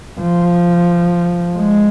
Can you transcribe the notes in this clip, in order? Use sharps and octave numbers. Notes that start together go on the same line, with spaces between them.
F3
G#3